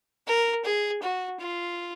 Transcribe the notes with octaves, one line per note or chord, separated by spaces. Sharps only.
A#4
G#4
F#4
F4